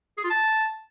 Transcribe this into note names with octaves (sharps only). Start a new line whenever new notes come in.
G#4
F4
A5